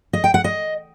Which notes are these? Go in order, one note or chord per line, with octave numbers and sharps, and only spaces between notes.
D#5
G5
F#5
D#5